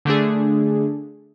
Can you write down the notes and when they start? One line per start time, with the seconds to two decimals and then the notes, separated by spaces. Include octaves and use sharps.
0.05 D3 A3 D4 G#4